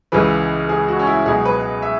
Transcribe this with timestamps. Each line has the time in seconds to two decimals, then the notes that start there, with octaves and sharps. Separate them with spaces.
0.12 C#2 C#3 E3 B4
0.69 G#4
0.88 F#4
0.99 C#4
1.07 E4
1.26 C#2 B2 F#3 G#4
1.45 B4
1.82 E5